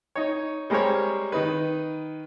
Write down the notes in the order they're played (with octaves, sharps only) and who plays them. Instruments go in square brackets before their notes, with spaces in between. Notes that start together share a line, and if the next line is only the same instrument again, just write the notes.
[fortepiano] D#4 C#5
G3 G#3 G4 A#4 C5 C#5
D#3 D#4 B4